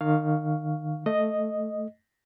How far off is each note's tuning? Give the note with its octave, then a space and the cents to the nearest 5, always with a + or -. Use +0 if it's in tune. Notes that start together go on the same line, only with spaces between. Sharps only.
D#3 -30 F5 +0 C#6 +10
A3 +0 D#5 +0